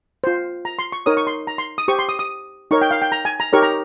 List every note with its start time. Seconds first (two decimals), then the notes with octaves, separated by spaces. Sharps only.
0.24 F4 C5
0.65 A#5
0.79 C6
0.92 C#6
1.06 D#4 A#4 C#5 D#6
1.17 C#6
1.27 C6
1.47 A#5
1.58 C6
1.78 D#6
1.88 G4 C5 C#6
1.99 C6
2.09 D#6
2.19 D#6
2.71 D#4 A#4 C#5 C#6
2.82 G5
2.91 F5
3.02 G5
3.12 A#5
3.25 G#5
3.40 A#5
3.53 D#4 G4 A#4 C#5 C#6
3.63 A#5